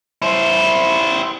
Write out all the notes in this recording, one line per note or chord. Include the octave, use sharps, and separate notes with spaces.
E4 C5